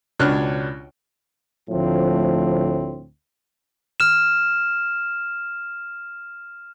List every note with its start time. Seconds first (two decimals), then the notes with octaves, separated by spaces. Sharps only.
0.19 C#2 B2 D4 C#5 F6 F#6
1.70 D2 A2 F3 C4
4.00 F6 E7